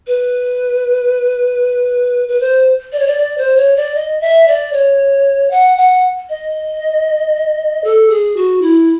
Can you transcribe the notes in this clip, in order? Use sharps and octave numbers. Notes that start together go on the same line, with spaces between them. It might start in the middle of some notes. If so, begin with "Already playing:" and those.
B4
B4
C5
D5
C#5
D5
D5
C5
C#5
D5
D#5
E5
D5
C#5
F#5
F#5
D#5
A4
G#4
F#4
E4